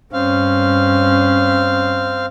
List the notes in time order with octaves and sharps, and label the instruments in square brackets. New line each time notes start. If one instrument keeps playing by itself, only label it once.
[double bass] G2 C#4 [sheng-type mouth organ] C4 F5